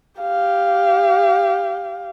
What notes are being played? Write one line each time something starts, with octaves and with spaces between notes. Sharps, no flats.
G4 F5